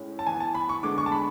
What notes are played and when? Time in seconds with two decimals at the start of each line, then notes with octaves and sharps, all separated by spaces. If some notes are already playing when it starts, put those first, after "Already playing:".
Already playing: A2 G#3 C#4
0.19 A5
0.26 E3 B3 G#5
0.40 A5
0.55 B5
0.69 C#6
0.83 D3 G#3 B3 D6
0.98 C#6
1.06 A5
1.12 B5